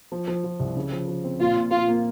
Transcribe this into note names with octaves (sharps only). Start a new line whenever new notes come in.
F3
F3
F3
C2
C#3
F3
F3
C4
A#2 F4
A#2
A#2 F4
A#3